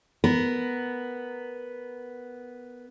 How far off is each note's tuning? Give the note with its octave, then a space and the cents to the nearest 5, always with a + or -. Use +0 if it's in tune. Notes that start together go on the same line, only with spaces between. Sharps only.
B3 +0 A#4 +0